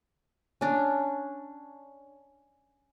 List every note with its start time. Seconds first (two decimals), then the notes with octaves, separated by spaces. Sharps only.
0.61 C#4 D4